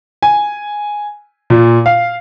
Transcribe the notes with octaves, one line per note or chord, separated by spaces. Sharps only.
G#5
A#2
F5